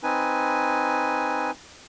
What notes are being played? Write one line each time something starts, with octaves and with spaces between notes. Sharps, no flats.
C4 D#4 B4 G#5